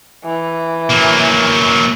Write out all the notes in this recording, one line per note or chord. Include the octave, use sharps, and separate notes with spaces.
E3
F#3 A#3